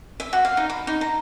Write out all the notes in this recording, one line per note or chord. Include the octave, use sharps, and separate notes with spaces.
E5
F#4
F5
D#4
B5
D#4
A#5